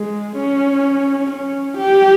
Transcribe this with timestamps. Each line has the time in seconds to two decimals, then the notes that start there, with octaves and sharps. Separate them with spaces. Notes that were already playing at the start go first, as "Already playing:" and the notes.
Already playing: G#3
0.37 C#4
1.31 C#4
1.77 G4